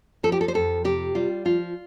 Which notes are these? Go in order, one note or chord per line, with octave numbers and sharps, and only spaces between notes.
F3 A4
G4
A4
C5
F2 A4
C3 G4
G3 F4
F3 F4